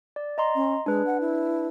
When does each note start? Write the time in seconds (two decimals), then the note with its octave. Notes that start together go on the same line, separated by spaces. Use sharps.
0.16 D5
0.38 D#5 A#5 C6
0.55 C#4
0.86 G#3 D4 B4
1.06 F#5
1.21 E4